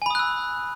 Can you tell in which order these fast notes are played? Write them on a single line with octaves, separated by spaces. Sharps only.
G#5 B5 D#6 F#6 E6